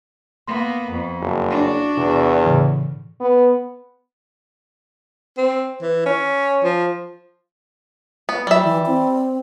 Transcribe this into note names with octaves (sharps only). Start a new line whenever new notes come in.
A#3 B3 C6
F2
F#1
D4 F#4
E2 C3
A2 C#3 E3
B3
C4
E3
C#4
F3
B3
F#3 G3 E5
E3
C4